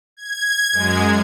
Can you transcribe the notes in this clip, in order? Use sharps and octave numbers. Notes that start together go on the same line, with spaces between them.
G#6
F#2 G#3